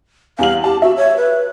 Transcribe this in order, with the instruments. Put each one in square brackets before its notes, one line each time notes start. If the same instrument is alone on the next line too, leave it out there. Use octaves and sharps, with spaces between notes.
[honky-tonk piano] E2 G3 F#7 [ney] F5
[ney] G4 [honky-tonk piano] A5
[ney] F#4 [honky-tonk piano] E5
[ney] C#5
B4